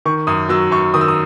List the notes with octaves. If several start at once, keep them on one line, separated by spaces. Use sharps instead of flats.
D#3 C#6
F#2 D#6
F#3 E6
F#2 C#6
D#3 D#6
E6
D#6